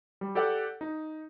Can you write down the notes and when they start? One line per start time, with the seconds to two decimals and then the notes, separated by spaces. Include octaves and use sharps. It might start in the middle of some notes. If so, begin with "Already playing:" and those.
0.21 G3
0.35 G4 A4 D5 F#5
0.81 D#4